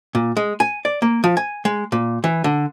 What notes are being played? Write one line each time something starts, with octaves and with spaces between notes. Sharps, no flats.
A#2
G#3
G#5
D5
A#3
F3
G#5
G#3
A#2
E3
D3